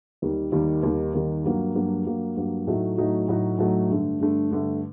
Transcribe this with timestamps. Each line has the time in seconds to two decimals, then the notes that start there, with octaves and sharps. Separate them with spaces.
0.22 D#2 D#3 G3
0.52 D#2 D#3 G3
0.83 D#2 D#3 G3
1.14 D#2 D#3 G3
1.44 G2 F#3 A#3
1.75 G2 F#3 A#3
2.06 G2 F#3 A#3
2.36 G2 F#3 A#3
2.67 A2 F#3 A3 D#4 F#4
2.98 A2 F#3 A3 D#4 F#4
3.28 A2 F#3 A3 D#4 F#4
3.58 A2 F#3 A3 D#4 F#4
3.89 G2 D3 A3
4.20 G2 D3 A3
4.51 G2 D3 A3